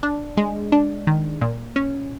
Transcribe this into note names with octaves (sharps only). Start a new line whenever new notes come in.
D4
G#3
D4
D#3
A#2
C#4